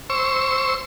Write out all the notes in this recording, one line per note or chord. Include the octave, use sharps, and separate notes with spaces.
C5 C#6 E6